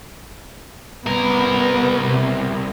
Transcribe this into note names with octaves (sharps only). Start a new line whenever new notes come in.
C2 B3 A#4
C3